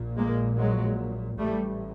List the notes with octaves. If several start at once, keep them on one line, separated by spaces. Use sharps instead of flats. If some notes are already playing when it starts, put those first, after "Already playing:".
Already playing: A#1 A#2
G#3 A#3
F#3 G#3
A1 A2 G3 A3